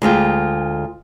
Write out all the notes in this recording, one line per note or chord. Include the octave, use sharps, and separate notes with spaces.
D2 G#3 F4 G5